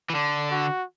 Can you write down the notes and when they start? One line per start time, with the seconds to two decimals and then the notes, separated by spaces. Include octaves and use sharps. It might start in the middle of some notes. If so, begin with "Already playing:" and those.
0.10 E3
0.14 D3 D5
0.51 F#4